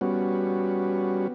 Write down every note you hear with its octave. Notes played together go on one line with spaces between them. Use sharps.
G3 B3 C#4 F#4